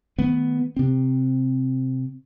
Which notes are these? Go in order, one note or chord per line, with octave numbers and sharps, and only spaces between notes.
D#3 A3 B3
C3 C4